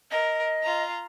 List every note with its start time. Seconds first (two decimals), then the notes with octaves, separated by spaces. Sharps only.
0.11 A#4 D#5
0.62 F4 A#5